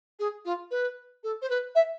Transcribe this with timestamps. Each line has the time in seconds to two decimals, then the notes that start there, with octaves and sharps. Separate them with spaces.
0.19 G#4
0.45 F4
0.70 B4
1.23 A4
1.42 C5
1.49 B4
1.75 E5